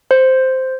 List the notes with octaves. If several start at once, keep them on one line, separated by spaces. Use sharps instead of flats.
C5